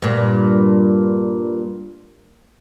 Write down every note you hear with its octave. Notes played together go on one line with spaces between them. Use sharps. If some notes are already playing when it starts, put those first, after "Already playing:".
G2 A#2